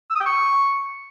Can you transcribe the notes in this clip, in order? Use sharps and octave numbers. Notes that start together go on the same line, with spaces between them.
E6
D#6
G5
C#6